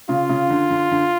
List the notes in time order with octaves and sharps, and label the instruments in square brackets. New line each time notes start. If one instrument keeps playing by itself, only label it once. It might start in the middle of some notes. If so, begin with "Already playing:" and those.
[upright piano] C#3 [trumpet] F4
[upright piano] C#3
D3
D3
D3